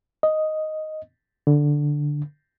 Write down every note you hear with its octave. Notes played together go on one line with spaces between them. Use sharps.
D#5
D3